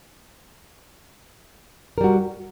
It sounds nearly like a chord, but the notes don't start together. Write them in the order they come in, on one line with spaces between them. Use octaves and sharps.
A#4 G3 F#4